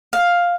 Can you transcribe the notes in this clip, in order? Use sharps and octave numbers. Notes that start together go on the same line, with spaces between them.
F5